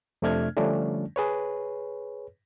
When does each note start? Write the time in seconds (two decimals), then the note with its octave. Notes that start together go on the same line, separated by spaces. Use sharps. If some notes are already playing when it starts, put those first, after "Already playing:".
0.22 F2 C3 A3 D4 F6 G#6
0.57 D3 F3 G3 A3 C#4 D4
1.16 G#4 B4 C#5